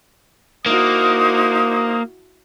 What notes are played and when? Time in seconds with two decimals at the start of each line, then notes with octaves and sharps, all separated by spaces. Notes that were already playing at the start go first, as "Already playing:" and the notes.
0.66 A#3 D#4 E4 F#4 C5 D#6